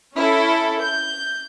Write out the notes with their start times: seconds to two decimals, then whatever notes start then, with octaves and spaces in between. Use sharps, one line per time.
0.16 C#4 E4 A4
0.81 G6